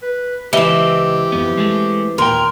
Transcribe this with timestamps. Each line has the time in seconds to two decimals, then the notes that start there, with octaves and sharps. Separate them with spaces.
0.03 B4
0.53 C#2 E3 C4 G4 D#5
1.32 F2 B3
1.57 G#3 A3
2.18 D#2 A#2 A#4 G5 C6